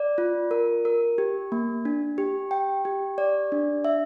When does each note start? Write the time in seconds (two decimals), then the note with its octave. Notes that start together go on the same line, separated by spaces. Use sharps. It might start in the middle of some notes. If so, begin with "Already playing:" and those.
Already playing: D5
0.18 F4
0.51 A#4
0.85 A#4
1.18 G4
1.52 A#3
1.85 D4
2.18 G4
2.51 G5
2.85 G4
3.18 D5
3.52 D4
3.85 E5